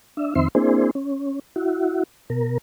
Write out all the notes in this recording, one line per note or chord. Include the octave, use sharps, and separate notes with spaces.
D4 E5
F2 D#3 C4 E5 C6
A#3 C4 D4 E4 G#4 C5
C#4
E4 F#4
B2 A#4